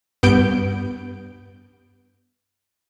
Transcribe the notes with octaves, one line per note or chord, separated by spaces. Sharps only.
G2 B3 G6 D7